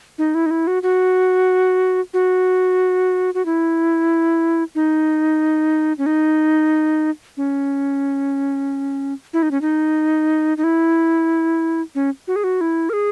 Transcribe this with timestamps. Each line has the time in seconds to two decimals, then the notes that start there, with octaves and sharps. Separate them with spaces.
0.18 D#4
0.35 E4
0.46 D#4
0.51 E4
0.67 F#4
0.83 F#4
2.14 F#4
3.34 F#4
3.45 E4
4.75 D#4
5.98 C#4
6.06 D#4
7.37 C#4
9.33 E4
9.43 D#4
9.51 C#4
9.61 D#4
10.57 D#4
10.64 E4
11.95 C#4
12.28 F#4
12.36 G#4
12.44 F#4
12.61 E4
12.90 A#4
12.93 G#4